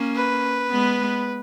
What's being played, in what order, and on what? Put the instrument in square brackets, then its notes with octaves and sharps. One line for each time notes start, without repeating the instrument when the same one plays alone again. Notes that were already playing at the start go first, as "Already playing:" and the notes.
Already playing: [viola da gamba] A#3 C#4
[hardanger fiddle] B4
[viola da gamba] G#3 B3